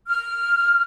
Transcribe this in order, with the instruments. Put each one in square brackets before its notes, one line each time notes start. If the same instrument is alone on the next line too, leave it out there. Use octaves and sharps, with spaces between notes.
[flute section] F6